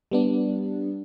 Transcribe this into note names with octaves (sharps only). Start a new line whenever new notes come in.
G3 B3 D4